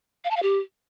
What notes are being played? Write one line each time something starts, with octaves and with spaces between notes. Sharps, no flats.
F5
A5
F5
G4